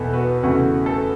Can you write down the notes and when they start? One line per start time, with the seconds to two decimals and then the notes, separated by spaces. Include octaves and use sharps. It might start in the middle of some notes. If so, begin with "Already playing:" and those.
Already playing: E2 B2 B3 A4 B5
0.13 F#4 B4
0.43 E2 C#3 A3 F#4
0.86 A4